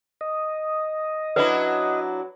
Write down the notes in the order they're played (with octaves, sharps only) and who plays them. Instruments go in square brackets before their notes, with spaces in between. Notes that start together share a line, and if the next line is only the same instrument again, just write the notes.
[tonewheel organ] D#5
[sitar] F#3 D4 E4 [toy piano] B4